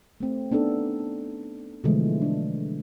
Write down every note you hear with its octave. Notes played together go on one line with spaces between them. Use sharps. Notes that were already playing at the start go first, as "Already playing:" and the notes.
A3 C4
B3 D4 D#4 A4
B2 D3 E3 F3 G#3 A3
D4